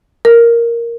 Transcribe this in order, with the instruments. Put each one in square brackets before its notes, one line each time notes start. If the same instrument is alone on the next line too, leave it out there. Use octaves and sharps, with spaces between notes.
[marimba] A#4